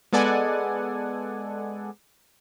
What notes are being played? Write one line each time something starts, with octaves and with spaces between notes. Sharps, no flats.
G#3 B3 A4 D5 F#5 G#5